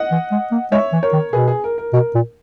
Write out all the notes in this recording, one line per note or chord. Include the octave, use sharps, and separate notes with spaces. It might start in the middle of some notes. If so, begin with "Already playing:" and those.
Already playing: D#5 F#5
E3
G#3
A#3
G#3 C#5 E5
E3
A#4 C#5
D#3
B2 G#4 B4
G#4
A#4
A#4
B2 A#4
A#2